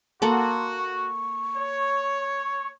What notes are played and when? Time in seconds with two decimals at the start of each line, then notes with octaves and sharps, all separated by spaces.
0.22 A#3 F#4 A4 F#5 C6
0.78 C#6
1.56 C#5